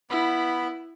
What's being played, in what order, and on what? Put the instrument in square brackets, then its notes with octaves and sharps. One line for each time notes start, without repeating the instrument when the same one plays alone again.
[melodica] B3 B5 [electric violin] E4